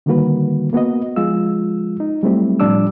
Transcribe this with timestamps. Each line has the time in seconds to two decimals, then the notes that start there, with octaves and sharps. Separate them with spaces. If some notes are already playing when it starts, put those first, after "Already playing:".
0.06 D3 D#3 G3 A#3 F#4 B4
0.73 A#3 B3 F#4 D#5
1.16 F3 G#3 F4 E6
2.00 D#4
2.23 F#3 G3 A3 C4 E4 G4
2.60 A2 F3 G3 D4 D6 E6